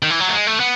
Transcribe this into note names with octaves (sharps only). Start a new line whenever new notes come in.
D#3
E3
F#3
A3
G#3
A3
B3